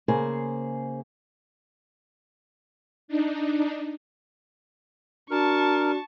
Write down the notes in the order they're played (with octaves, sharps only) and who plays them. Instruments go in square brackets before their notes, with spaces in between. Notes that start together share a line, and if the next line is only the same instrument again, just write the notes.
[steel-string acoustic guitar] C#3 A#3 G#4 C5
[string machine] D4 D#4
[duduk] D4 [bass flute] F#4 [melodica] A#4 [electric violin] A5 C#6